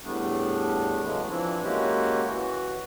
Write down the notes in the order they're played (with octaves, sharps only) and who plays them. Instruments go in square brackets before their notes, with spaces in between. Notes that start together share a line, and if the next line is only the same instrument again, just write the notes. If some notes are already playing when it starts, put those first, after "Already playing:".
[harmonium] E2 A2 G3 A3 B3 D4
C#3 E3 F#3 G#3 A3
E3 F3 C4 D4 E4
G#3 A#3 C#4 E4 F#4 G4
E3 F#4